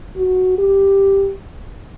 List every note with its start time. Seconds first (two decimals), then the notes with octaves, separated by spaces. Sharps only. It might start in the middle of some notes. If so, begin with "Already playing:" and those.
0.17 F#4
0.58 G4